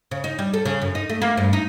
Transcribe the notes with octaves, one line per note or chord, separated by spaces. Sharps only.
C#3
D#4
G3
A4
C#3
F#2
D#4
A3
A#3
G2
D#4